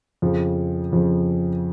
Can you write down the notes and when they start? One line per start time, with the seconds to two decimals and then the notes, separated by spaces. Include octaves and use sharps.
0.22 F2 C#3 F3
0.93 F2 C#3 F3